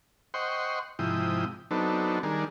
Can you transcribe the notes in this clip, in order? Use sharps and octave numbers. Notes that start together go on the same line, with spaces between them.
C5 D#5 F#5 G5 C6 C#6
G#2 C3 F3 E4 G5 D#6
F#3 B3 C4 D4 D#4 A4
D#3 G3 D4 G#4 A#4